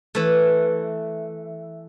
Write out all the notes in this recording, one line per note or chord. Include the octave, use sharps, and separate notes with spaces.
E3 A3